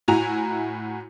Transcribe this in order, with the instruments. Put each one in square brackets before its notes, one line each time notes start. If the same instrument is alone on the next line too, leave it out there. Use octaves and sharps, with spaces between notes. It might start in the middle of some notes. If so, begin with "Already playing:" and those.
[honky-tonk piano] A2 E4 F#4 G#5 A#5 F7